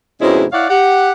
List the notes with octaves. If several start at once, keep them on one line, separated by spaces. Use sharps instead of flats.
F2 G#2 B2 G#3 C#4 E4
E4 C#5 D5 F5 F#5
G4 F#5